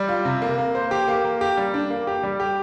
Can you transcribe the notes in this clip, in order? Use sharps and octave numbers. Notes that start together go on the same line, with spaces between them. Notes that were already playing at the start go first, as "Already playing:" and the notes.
Already playing: G3
F4
C3
A#3
A#3
C5
G4
A#3
A#3
G4
G3
D4
A#3
G4
G3
G4